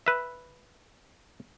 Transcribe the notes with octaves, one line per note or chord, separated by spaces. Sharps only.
B4 E5